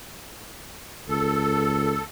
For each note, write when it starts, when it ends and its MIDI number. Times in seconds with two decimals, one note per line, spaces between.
1.09 1.99 37
1.09 2.04 69